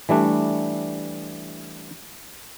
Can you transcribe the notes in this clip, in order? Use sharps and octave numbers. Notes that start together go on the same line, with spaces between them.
E3 G3 A3 D4